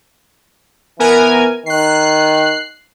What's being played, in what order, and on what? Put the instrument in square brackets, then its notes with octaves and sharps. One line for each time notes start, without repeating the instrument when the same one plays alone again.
[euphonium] E3 [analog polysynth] B3 A#4 G#5
[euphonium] D#3 [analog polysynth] F#6 C7